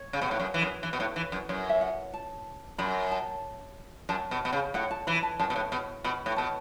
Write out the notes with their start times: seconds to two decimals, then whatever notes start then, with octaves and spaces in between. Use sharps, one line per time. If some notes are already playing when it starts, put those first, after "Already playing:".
Already playing: C#5
0.13 C#3
0.21 B2
0.31 A2
0.40 F#2
0.54 E3
0.61 F#2
0.83 E3
0.93 B2
1.00 A2
1.16 E3
1.32 F#2
1.49 F#2 C#5
1.69 E5
1.81 F#5
2.13 A5
2.78 F#2 B5
3.11 A5
4.09 F#2 A5
4.31 B2
4.45 B2
4.53 C#3
4.74 A2 F#5
4.91 A5
5.07 E3 B5
5.23 A5
5.39 F#2 A5
5.50 B2
5.56 A2
5.72 B2
6.04 B2 B5
6.26 A2
6.36 B2 A5